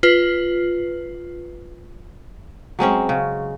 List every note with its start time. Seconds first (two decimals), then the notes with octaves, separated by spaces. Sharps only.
0.03 F4 B4
2.79 F#3 G#3 C4 C#4
3.09 C#3